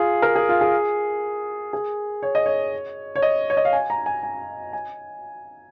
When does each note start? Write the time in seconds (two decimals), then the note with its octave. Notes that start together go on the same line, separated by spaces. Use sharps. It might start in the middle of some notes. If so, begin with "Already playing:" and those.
Already playing: F4 G#4
0.22 A#4
0.35 G#4
0.49 F4
0.61 G#4
1.73 G#4
2.23 C#5
2.35 D#5
2.46 C#5
3.16 C#5
3.22 D#5
3.50 C#5
3.57 D#5
3.65 F5
3.73 G#5
3.90 A#5
4.06 G#5
4.23 G#5
4.73 G#5